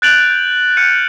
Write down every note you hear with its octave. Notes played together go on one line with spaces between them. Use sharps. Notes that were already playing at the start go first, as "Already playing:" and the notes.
F#6 G6 A6 D7 F7 F#7
G6
F6 G6 C#7 D#7